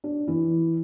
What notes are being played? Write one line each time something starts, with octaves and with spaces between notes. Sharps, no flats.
D4
E3